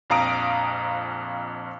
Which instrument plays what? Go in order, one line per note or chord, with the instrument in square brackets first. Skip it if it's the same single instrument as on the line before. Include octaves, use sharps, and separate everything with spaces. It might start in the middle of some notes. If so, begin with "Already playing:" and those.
[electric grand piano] A#1 F2 F5 A#5 D#6 D7